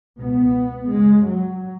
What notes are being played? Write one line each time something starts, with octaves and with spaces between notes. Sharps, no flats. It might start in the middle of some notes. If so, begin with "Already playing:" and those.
C#2 B2 B3
F#2 C#3 G#3
F#3